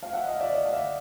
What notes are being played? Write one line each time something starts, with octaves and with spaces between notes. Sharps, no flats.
F5
E5 F#5
D#5 F5
D5 E5
C#5 D#5
F5
D5 E5